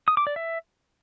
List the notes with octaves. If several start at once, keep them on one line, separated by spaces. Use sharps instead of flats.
D#6
D6
D5
E5